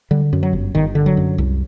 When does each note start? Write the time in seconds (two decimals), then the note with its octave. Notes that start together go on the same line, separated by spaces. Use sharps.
0.11 D3 G3
0.33 F#2
0.43 F#3
0.53 G1
0.75 G1 D#3
0.95 D3
1.06 F#3
1.17 F#2
1.38 C2